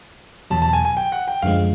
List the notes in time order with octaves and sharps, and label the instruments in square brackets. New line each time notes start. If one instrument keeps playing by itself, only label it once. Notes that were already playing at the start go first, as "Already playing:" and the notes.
[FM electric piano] E2 B2 F#3 [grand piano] A5
[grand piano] A5
G#5
G#5
G5
F#5
G5
[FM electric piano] F#2 D3 F3 G#3 [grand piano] F5